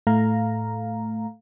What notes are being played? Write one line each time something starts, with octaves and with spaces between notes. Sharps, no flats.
A2 A3 F5 A#5